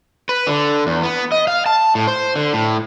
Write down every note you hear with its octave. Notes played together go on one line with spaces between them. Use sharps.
B4
D3
E2
B3
D#5
F5
A5
A2
C5
D3
A2